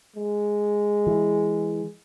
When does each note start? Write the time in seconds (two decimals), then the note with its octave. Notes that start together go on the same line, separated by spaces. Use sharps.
0.16 G#3
1.07 E3